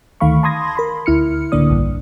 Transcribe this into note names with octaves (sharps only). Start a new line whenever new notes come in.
D2 D#3 A3 F5 B5 C#6
A5 B5 C6 D#6 G#6 A#6
A#4 B5 C6
D2 E4 F6 C#7
C#2 A2 D3 A#3 D5 D#6
A#1 G2